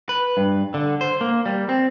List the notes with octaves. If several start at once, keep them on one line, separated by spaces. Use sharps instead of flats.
B4
G2
D3
C5
A#3
G3
C4